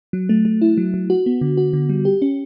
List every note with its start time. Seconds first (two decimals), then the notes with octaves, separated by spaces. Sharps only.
0.13 F#3
0.29 A3
0.45 A3
0.62 E4
0.77 F#3
0.94 F#3
1.10 F#4
1.26 B3
1.41 D3
1.57 F#4
1.73 D3
1.89 G3
2.05 G4
2.22 C#4